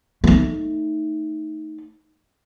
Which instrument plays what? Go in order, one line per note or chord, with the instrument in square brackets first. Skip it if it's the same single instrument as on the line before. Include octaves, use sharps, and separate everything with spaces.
[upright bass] A3 D#4